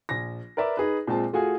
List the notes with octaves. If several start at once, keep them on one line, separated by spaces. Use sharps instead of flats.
A#1 A#6
A#4 B4 D5 E5
D#4 G#4 B4
A#2 G#3 C4 A5
A3 F4 F#4 G#4 G#5